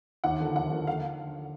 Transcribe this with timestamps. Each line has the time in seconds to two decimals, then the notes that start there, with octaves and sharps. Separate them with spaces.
0.24 D#2 F#5
0.40 D3 F3 A#3
0.55 D#2 F#5
0.71 D3 F3 A#3
0.87 D3 F5